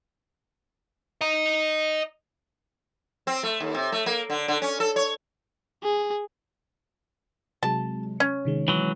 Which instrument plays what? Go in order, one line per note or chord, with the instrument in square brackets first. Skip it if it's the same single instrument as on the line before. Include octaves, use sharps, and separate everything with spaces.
[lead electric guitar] D#5 A#5
[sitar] C4
A3
D#2
C3
A3
A#3
D3
D3
C#4
A4
C#5
[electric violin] G#4
[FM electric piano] C3 F#3 G#3 [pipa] A5
[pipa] C#4
[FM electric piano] C3 D#3 G#3
[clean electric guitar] E3 F#3